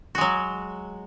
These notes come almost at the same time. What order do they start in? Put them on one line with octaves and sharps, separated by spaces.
F#4 G#3 F#3